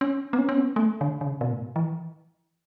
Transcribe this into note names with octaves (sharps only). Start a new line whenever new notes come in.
C#4
B3
C#4
C#4
B3
A3
D3
D3
C#3
B2
A2
E3